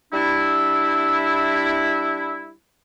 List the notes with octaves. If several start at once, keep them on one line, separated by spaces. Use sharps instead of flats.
G3 D4 E4